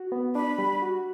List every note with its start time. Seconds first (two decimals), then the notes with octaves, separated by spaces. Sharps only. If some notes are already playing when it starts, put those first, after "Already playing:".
Already playing: F#4
0.12 B3
0.35 D4 B5
0.59 G3
0.82 F#4